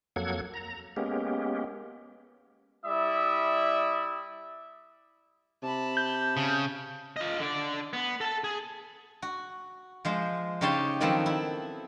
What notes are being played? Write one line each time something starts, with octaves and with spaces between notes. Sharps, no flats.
F2 F#3 A#3 A4 F#5 G#6
A#5
G#3 A#3 B3 C#4 G4
G3 E4 D5 E5 D#6
C3 A5 B5
G6
C#3
F4 D#5
D3 D5
B3
A4 A5
G#4
F#4
F3 G#3 C5
C#3 D#4 G4 C#5 A5 C6
D#3 F3 F#3 B3 C4 A4
E4